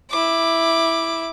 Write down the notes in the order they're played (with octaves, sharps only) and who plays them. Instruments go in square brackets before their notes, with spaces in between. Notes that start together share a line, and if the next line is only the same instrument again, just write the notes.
[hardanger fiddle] E4 D6